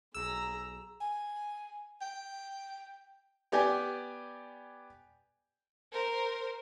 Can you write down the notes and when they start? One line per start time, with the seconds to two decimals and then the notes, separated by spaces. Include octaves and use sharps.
0.15 B1 G#4 A#5 E6
1.01 G#5
2.01 G5
3.52 B3 G4 D5 G5 G#5
5.92 A#4 C5